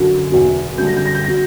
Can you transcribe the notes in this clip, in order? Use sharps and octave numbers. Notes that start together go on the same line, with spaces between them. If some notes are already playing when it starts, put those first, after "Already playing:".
Already playing: F#2 D3 F#3
E2 B2 F#3
F#2 D3 G3 G6
A#6
G6
A#6
G6
A#6
F#3